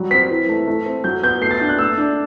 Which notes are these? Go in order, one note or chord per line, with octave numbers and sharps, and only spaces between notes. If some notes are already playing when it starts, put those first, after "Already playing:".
Already playing: F#3 G3
C4 B6
E3
A3
A3
C4
F#3 G6
B3 G6
A3 C7
A6
D4 G6
F#6
A3 E6
D4